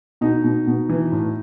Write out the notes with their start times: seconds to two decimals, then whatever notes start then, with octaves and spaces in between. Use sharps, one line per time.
0.21 B2 D#4
0.44 B2
0.67 B2
0.89 E3
1.12 A2